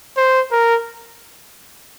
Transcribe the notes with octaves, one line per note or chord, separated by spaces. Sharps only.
C5
A#4